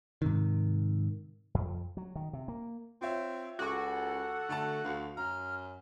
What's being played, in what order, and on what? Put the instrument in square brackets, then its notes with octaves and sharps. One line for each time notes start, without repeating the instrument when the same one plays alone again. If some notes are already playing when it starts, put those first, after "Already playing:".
[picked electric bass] G#2 C3 D#3
[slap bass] F2
F#3
D#3
C3
A#3
[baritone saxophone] C4 [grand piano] F4 C#5 E5
[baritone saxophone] C#2 [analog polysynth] F#4 [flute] A4 [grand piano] C#6 D6
[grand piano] D3 A5 [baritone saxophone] A3
[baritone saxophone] D2 [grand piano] F5
[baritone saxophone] F#2 [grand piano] A#5 [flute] F6